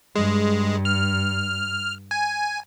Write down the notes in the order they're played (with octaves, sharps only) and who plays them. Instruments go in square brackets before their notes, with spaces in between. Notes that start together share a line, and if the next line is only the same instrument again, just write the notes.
[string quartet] G2 [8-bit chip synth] G#3
[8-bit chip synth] F6
G#5